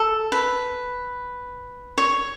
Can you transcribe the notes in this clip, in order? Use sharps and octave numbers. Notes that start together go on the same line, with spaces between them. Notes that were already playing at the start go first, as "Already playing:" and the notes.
Already playing: A4
B4
C#5